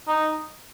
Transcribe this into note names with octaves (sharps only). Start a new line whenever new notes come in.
D#4